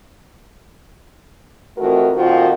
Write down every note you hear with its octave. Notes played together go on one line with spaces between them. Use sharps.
F2 E3 A3 F#4 A#4
F2 A#2 D#3 F3 F4 F#4